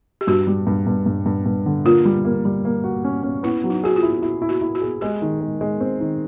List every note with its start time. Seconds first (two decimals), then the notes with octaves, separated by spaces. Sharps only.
0.21 G4
0.27 G2 F#4
0.47 G3
0.67 G2
0.87 G2
1.06 G2
1.26 G2
1.46 G2
1.66 D3
1.85 A#3 F4
2.05 G3
2.25 A#3
2.45 G3
2.65 A#3
2.84 F#4
3.04 C#4
3.23 C#4
3.43 B3 E4
3.64 F#3
3.70 D#4
3.84 F#4 G#4
3.96 F4
4.03 E4
4.22 E4 F#4
4.42 E4
4.49 F#4
4.61 E4
4.75 F#4
4.82 G#4
5.01 G#3 G4
5.22 D#3
5.41 G#3
5.61 G#3
5.80 C4
6.00 D#3